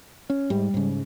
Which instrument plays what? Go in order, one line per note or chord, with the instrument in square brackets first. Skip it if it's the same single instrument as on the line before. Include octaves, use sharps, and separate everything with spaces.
[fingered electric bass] C#4
[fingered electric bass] G#2 [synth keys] G3
[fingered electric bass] G#2 C#3